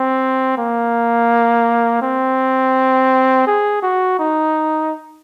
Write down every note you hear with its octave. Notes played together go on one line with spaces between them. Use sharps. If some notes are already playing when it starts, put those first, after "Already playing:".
Already playing: C4
A#3
C4
G#4
F#4
D#4